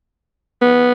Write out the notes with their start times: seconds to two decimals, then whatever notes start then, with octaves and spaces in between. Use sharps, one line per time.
0.62 B3